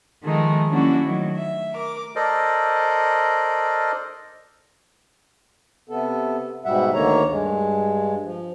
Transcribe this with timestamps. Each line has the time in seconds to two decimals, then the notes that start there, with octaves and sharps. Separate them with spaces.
0.24 D#3 F3 G#3 A3 D#4
0.70 F#3 A#3 C#4 D4 E4 F#4
1.04 D#3 F#3 A3
1.35 E5
1.72 A#4 D6
2.16 A4 A#4 C5 D5 D#5
5.89 C3 B3 A4
6.65 G#2 B2 G3 E5 F#5
6.94 D2 D3 D#3 A#3 C#5 A#5
7.29 G2 G#3
8.23 F3